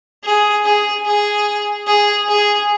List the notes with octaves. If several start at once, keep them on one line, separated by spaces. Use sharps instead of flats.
G#4
G#4
G#4
G#4
G#4